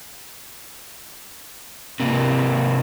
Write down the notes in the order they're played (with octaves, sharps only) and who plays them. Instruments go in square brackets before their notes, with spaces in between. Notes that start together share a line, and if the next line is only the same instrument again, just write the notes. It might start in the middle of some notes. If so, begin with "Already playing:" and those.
[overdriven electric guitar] C3 A#3